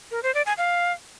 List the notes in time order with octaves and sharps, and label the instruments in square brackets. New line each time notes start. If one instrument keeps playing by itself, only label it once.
[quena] A#4
C5
D5
G#5
F5